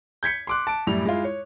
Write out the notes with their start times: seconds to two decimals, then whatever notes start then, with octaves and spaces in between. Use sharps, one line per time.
0.23 G6 G#6 B6 C#7
0.47 C6 D6 F#6
0.67 A5 D7
0.87 F#2 A2 G3 E4 F7
1.05 G#3 E4 F4
1.24 C#5